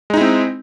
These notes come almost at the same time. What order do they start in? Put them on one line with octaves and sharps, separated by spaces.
G#3 D#4 E4 C4